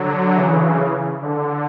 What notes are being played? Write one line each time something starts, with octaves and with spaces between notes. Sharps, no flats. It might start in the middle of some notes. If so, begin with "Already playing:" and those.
Already playing: D3 F#3
C#3 E3
D3